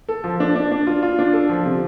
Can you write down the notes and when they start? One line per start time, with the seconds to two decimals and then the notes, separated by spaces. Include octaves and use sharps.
0.08 A4
0.24 F3
0.40 D4
0.56 D4
0.72 D4
0.87 F4
1.03 F4
1.19 D4
1.33 A4
1.49 F3
1.66 C3